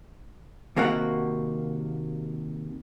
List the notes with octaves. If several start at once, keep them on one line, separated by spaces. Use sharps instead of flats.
D#2 C3 A#3 F#4 F#5